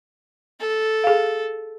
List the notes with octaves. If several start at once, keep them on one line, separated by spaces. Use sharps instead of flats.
A4
G#4 F5